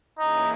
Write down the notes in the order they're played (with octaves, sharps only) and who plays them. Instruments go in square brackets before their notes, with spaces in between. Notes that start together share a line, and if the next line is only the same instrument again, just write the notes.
[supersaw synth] E3 A#3 C#4 E4 G#4 [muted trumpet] D#4